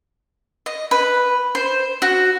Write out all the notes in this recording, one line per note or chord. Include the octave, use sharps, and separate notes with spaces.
D#5
B4
C5
F#4